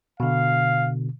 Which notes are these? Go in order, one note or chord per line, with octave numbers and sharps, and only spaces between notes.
B2 D3 F5